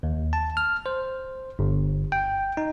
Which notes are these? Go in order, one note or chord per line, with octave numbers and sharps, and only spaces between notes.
D#2
A5
F6
C5
G1
G5
D#4